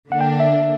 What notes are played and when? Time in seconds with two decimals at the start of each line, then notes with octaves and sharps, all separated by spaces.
0.11 D3 A#3 D4 F#5
0.21 G5
0.40 E5